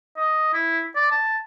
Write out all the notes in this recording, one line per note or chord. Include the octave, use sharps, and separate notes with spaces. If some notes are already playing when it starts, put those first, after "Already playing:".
D#5
E4
D5
A5